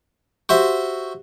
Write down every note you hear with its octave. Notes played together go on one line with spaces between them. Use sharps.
F#4 G4 C5 E5